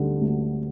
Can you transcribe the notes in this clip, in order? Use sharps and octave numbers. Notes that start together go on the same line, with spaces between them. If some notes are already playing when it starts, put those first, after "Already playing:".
Already playing: D2 D3 G3
D2